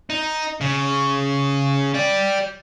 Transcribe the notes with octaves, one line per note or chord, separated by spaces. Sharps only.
D#4
C#3
G4 D5